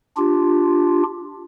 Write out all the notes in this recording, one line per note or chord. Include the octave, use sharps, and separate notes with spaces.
D4 F4 G4